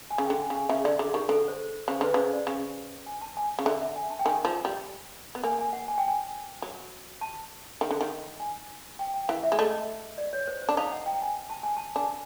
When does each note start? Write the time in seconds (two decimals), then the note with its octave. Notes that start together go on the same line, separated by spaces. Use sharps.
0.11 G#5
0.18 C#3
0.25 D3 G5
0.40 G#5
0.50 C#3 G#5
0.69 C#3 E5
0.84 D3 D5
0.99 D3 G#4
1.14 D#3 G4
1.29 D3 A4
1.48 C5
1.88 C#3 C5
2.01 D3 B4
2.14 C#3 C5
2.33 D5
2.47 C#3
3.06 G#5
3.21 A5
3.37 G#5
3.51 G#5
3.59 C#3
3.65 D3 E5
3.81 E5
3.96 G#5
4.10 A5
4.19 G5
4.25 D#3 G#5
4.45 F3
4.65 G3
5.35 B3
5.44 A#3 G#5
5.59 G#5
5.73 F#5
5.88 G#5
5.98 G5
6.08 G#5
6.62 F#3
7.21 A5
7.81 D#3
7.91 D3
8.01 D#3
8.40 G#5
8.99 G5
9.14 G5
9.29 E3 F5
9.43 E5
9.52 G#3
9.59 A3 D#5
10.18 D5
10.33 C#5
10.47 C5
10.62 C5
10.69 D4
10.77 D#4 F5
10.92 F#5
11.06 G5
11.22 G#5
11.50 A5
11.63 G#5
11.77 A5
11.96 D4 G#5